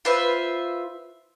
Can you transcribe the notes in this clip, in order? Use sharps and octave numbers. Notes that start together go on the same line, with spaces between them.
F4 B4 C5 E5